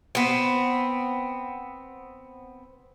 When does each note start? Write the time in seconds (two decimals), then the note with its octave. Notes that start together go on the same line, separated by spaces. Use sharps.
0.15 B3 C4